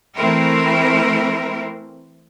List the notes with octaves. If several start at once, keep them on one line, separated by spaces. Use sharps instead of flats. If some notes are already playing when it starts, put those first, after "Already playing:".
E3 A3 C4 E4 A#4